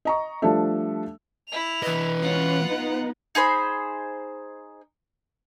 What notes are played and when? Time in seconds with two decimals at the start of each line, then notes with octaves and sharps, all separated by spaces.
0.05 D#5 A#5 C#6
0.42 F3 G3 A3 D4 A4 E5
1.48 E4 F7
1.83 E3 B4 D#5
2.21 C#4 F4 F#5
2.64 B3 D#4
3.35 D#4 G#4 C5 B5